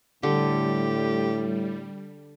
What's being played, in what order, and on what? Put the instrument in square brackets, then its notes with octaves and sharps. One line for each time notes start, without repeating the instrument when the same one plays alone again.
[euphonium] A2 [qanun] D3 [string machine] G3 [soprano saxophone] G4